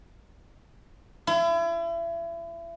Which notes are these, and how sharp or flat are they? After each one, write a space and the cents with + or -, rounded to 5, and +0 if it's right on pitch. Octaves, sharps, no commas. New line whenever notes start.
E4 +35